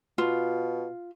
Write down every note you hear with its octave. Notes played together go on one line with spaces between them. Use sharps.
B2 F4